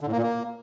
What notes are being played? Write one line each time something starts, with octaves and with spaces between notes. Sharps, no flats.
D3
A2
A#3
A#2
A#3